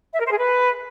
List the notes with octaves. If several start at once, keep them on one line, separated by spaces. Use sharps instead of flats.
E5
A#4
C5
G#4
B4